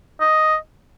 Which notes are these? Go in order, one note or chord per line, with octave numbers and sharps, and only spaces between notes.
D#5